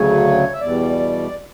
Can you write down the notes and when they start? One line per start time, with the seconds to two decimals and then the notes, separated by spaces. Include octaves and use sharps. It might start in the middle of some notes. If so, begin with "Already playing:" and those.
Already playing: D2 C#3 F#3 C#5
0.53 E5
0.61 E2 B2 G3 D5